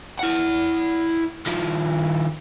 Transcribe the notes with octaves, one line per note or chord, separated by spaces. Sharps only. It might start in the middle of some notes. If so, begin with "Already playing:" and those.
E4 F#5
D#3 F3